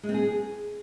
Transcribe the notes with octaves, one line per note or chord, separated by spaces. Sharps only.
G#3
C4
G#4